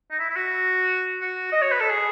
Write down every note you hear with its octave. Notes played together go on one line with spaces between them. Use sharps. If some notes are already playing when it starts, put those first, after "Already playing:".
D#4
E4
E4
F#4
F#4
D#5
C#5
B4
A4
G#4